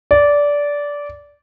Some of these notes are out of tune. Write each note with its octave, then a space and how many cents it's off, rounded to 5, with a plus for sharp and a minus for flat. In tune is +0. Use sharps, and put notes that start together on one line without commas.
D5 -15